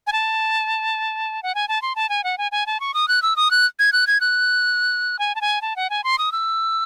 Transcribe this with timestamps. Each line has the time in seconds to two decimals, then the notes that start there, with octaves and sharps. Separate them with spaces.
0.07 G#5
0.13 A5
1.43 F#5
1.55 G#5
1.68 A5
1.82 C6
1.96 A5
2.09 G#5
2.24 F#5
2.38 G#5
2.52 G#5
2.67 A5
2.80 C#6
2.94 D#6
3.08 F#6
3.22 E6
3.36 D#6
3.51 F#6
3.79 G#6
3.93 F#6
4.07 G#6
4.21 F#6
5.19 G#5
5.35 A5
5.41 G#5
5.62 A5
5.76 F#5
5.90 G#5
6.04 C6
6.18 D#6
6.32 E6